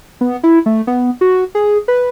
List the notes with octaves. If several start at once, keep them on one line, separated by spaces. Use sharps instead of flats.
B3
E4
A3
B3
F#4
G#4
B4